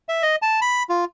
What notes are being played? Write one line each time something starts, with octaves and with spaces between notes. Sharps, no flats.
E5
D#5
A5
B5
F4